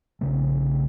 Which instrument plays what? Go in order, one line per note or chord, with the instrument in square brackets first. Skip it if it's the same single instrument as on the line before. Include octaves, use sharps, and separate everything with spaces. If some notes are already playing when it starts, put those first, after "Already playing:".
[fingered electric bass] A#1 C#3 A3